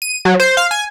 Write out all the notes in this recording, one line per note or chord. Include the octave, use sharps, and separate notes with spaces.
D#7
F#3
C5
F5
G#5